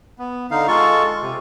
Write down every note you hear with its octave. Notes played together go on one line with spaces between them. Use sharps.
B3
D3 D#4 F5
G#3 F4 A4 C#6
C3